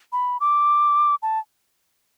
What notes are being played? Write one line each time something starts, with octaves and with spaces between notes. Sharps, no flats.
B5
D6
A5